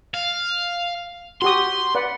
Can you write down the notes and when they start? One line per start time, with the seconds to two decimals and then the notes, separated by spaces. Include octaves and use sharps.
0.14 F5
1.42 F#4 G4 C6 D#6
1.95 B4 D5 F#5